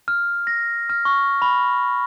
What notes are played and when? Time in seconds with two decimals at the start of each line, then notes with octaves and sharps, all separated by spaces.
0.08 F6
0.47 A#6
0.90 F6
1.05 C#6
1.42 B5